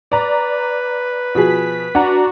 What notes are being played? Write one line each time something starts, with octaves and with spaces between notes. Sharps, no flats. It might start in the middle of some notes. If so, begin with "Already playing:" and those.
B4 D5 A#5
B2 F3 G#4 B6
D4 F#4 F#5 A#5